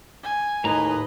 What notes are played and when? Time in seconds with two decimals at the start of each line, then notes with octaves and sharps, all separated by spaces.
0.23 G#5
0.64 D#2 A2 B4 D#5 A#5